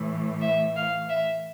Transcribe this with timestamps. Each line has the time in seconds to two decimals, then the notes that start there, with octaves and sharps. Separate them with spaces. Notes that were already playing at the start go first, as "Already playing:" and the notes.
Already playing: A2 E3
0.41 E5
0.75 F5
1.09 E5